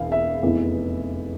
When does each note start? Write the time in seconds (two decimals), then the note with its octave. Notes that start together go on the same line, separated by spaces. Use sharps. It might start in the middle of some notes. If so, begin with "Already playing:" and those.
Already playing: E1 E2 F5
0.12 E5
0.42 F1 E2 E3